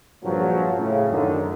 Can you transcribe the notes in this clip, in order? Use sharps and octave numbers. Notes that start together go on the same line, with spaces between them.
A#1 G2 A#2 C#3 F3 F#3
A2 C#3
F#2 D3 D#3